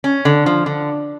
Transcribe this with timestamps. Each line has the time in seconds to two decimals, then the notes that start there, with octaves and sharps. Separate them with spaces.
0.04 C#4
0.25 D3
0.46 F3
0.66 D3